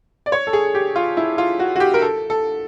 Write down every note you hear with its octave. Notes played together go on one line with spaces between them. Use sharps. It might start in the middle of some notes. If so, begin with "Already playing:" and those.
D5
C#5
A4
G#4
G4
F4
E4
F4
F#4
F#4
G4
A#4
A4
A4